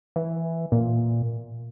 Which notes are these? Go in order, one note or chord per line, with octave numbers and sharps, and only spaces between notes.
E3
A#2